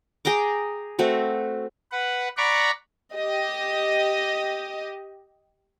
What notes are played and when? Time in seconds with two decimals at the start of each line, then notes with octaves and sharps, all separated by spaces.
0.25 G#4 G5 A#5 D6
0.99 A3 C4 F#4
1.92 B4 F#5
2.37 D5 F#5 A#5 B5 C#6 D6
3.13 G4 D#5